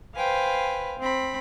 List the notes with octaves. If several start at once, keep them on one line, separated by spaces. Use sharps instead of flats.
B4 C5 F5 G5 G#5
C4 B5